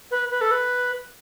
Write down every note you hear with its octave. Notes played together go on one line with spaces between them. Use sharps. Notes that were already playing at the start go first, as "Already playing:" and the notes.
B4
B4
A4
B4